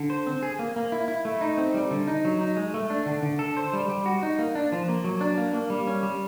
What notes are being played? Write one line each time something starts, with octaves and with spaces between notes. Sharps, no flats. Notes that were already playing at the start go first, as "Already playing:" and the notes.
Already playing: D3
C5
C4
G#4
A#3
A#3
E4
E4
A3
D#4
C4
G3
D3
D#4
F#3
D#4
G#3
A3
D4
D3
D3
A4
C5
G3
G3
F#4
D#4
A#3
D4
F3
A#3
F#3
D4
A#3
A#3
G3
C#4
G3